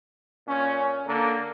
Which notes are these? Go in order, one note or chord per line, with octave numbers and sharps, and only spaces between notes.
A#2 C#4
D3 A#3